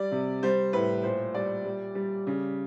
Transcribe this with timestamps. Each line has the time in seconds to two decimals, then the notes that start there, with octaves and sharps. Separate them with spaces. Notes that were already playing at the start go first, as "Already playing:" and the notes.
Already playing: G3 D5
0.12 C3
0.43 G3 C5
0.73 A2 B4
1.03 A#2 C5
1.35 G3 D5
1.65 G3
1.95 G3
2.27 C#3